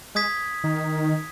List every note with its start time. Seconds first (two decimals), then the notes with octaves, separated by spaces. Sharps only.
0.15 G#3 D#6 G#6 B6
0.64 D#3